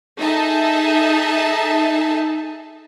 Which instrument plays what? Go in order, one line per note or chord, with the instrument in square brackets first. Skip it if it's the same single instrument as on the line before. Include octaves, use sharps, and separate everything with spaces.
[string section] D#4 G#4 A4 E5 A5